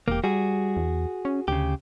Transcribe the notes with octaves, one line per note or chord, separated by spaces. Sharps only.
E1 A#3 G4
G3 F#4 G#4
E2
C#4
D2 C#3 G4